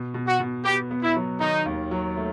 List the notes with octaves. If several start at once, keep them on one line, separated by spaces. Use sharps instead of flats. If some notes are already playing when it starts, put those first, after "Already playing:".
Already playing: B2
B2
F#4
B2
B3 G4
B3
E4
F#3
D#3 D#4
D#2
F#3
A3